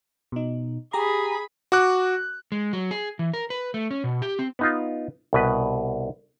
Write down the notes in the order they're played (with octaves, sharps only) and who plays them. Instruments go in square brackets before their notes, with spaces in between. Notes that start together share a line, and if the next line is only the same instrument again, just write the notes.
[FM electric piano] B2 D#4
[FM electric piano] G4 A#5 [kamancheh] G#4 B5
[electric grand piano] F#4 D6 F#6
[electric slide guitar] G#3
F#3
G#4
E3
A#4
B4
A3
C#4
B2
G4
C4
[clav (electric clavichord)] B3 D#4 F4
C2 B2 B4